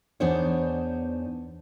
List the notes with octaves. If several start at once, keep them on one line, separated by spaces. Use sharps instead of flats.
E2 B3 D4 D#4 C5 C#5